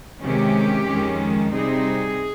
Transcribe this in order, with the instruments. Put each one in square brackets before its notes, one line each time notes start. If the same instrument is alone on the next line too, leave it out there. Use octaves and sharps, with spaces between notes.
[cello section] C3 D#3 G#3 C#4 G4
F2 D#3 G#3 C#4
C3 G3 C4 D#4 G#4